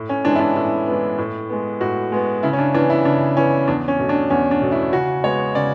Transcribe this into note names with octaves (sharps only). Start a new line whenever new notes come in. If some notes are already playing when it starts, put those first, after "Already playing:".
Already playing: A2
C#4
E3 G#3 B3 D4
E4
D4
A2 E4
E3 G#3 B3
A2
G#3 B3
A2 F#4
G#3 B3
C#3 E4
C#4
D4
E3 B3 D4
E4
C#3 D4
E3 B3 C#4
E2 D4
C#4
B2 A3
D4
E2 C#4
D4
B2 A3
E4
C#3 F#4
G#3 B3 C#5
C#3 D5